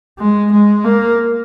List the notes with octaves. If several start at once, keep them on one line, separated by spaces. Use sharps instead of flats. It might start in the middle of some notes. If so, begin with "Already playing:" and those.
G#3
G#3
A#3